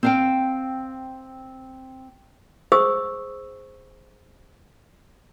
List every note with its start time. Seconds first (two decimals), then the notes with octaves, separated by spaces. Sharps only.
0.03 C4 F5 G5
2.72 G#4 C5 C#6 D#6 E6